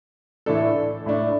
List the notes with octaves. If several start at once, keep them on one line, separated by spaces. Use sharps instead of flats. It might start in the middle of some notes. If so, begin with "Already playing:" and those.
A2 E3 A3 D4 A4
A2 A3 D4